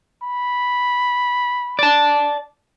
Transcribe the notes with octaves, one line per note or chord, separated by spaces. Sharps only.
B5
D5 A5